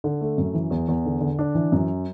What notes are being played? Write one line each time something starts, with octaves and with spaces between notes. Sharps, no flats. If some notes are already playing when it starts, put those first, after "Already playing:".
D3
A3
F#2
E3
E2
E2
D3
D3
D4
E3
F#2